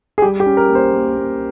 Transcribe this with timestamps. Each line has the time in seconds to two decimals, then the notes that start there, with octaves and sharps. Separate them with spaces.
0.18 G#4
0.22 G3 G4
0.40 G4
0.46 C#4
0.57 A#4
0.69 A#3
0.75 C5
0.93 A#3
1.17 A#3